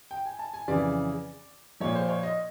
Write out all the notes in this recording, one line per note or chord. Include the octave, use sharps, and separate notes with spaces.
G5
G#5
A5
G#5
F2 C#3 E3 D5
A#2 F3 C#5
C5
C#5
D#5